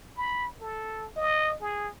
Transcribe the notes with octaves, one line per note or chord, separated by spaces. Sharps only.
B5
A4
D#5
G#4